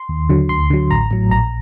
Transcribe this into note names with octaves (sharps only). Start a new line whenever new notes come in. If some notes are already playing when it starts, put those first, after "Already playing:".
Already playing: C6
D#2
D3 F#3
D2 C6
D3 F#3
A1 A#5
A2 F#3
A#1 A#5